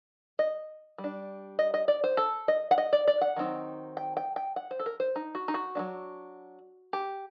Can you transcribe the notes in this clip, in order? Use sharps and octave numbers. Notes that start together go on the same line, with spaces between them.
D#5
G3
D4
D#5
D#5
D5
C5
A4
D#5
F#5
D#5
D5
D5
F#5
D#3 F#3 C4 D#4
G5
G5
G5
F#5
C5
A4
A#4
C5
D#4
F#4
D#4
F#4
F#3 A#3 D4
G4